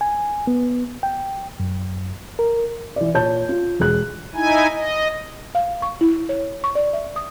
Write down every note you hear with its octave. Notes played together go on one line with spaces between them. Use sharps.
G#5
B3
G5
F#2
A#4
E3 D5
A#2 C#5 A5 G6
F4
E1 G#4 F#6
D#4 E4 G#5
D#5
F5
C#6
E4
C#5
C#6
D5
E5
D#6